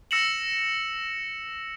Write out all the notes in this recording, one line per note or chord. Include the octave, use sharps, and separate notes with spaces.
E6 A#6 C#7 E7 F#7